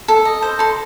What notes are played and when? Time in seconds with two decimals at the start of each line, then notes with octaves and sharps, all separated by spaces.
0.08 A4
0.25 D#5
0.42 C5
0.59 A4 C6